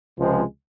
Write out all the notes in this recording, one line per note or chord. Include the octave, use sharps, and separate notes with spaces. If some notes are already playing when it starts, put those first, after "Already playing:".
C#2 C3 F3 G#3 C4